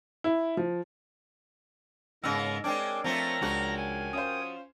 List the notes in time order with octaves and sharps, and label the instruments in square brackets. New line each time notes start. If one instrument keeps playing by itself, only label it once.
[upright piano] E4
F3
[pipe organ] G#2 G#3 [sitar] C#3 B3 [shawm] A#4 [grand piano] E6 F6 A#6
[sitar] G#3 C4 D4 [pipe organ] A#4 C#5 G5 [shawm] D5
[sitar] F3 A3 F4 [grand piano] C4 [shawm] A#5
[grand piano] C#2 C#3 D4 [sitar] F3 F#4
[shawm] G#5
[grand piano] C#4 F4 C5 [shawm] D#6